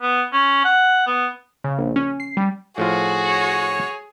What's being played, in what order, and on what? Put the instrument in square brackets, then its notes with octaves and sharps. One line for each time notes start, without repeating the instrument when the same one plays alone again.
[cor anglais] B3
C#4
F#5
B3
[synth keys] C#3
A#1
C#4
C7
G3
[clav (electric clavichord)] A2 F3 F4 [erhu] F#4 [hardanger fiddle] G#4
[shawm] C#5